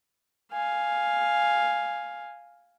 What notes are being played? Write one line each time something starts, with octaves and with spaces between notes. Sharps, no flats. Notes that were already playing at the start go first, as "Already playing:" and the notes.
F5 G#5